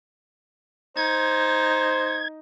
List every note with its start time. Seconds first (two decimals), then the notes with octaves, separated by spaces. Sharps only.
0.97 D#4 C5 G#6